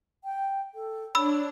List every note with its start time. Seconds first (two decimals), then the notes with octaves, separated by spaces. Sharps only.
0.24 G5
0.75 A4
1.15 D4 C#5 B5 E6